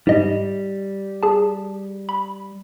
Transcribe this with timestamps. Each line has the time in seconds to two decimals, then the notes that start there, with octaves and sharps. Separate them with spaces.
0.07 G#2 G3 D#5
1.23 G#4 A5
2.09 B5